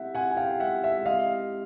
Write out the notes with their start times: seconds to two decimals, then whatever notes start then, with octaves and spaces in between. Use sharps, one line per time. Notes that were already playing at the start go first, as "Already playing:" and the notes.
Already playing: G#3 C4 E4 G4 E5 F#5
0.15 C4 F#5 G#5
0.31 G#5
0.37 G4 F5 G5
0.60 G#3 E5 F#5
0.83 G#3 E5
1.06 C4 D#5 F5
1.29 G4